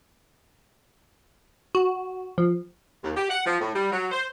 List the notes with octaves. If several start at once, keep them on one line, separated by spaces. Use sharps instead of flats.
F#4
F3
D#2
G4
F#5
F3
A2
G3
F#3
C5